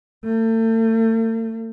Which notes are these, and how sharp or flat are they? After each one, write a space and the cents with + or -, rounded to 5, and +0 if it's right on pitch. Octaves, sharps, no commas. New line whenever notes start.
A3 +40